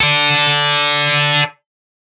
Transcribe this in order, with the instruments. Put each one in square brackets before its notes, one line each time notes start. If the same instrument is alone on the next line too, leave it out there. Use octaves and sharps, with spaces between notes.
[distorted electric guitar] A4 D5